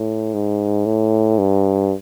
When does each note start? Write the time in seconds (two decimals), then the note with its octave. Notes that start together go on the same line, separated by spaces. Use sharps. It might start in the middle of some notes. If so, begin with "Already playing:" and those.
Already playing: A2
0.34 G#2
0.86 A2
1.38 G2